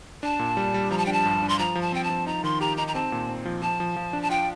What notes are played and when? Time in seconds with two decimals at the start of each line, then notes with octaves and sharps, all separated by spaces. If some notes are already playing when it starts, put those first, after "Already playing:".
0.23 D4 A5
0.39 A#2
0.57 G3
0.74 G3
0.91 F3 A#5
0.98 A5
1.06 D4 G5
1.13 A5
1.25 G2
1.42 D4
1.49 C6
1.59 F3 A#5
1.75 F3
1.82 A5
1.92 C4 G5
2.04 A5
2.10 F3
2.27 D#4 A#5
2.44 D#3 C6
2.61 G4 A#5
2.77 D#4 A#5
2.88 A#5
2.95 C4 A5
3.12 A#2
3.29 C4
3.45 F3
3.62 F3 A5
3.80 F3
3.96 F3
4.13 D4
4.22 A5
4.30 F4 G5